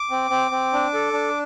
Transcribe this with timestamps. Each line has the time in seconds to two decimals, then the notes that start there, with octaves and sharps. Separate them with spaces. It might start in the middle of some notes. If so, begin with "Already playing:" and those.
Already playing: D6
0.11 C4
0.30 C4
0.51 C4
0.73 D4
0.94 A4
1.13 D4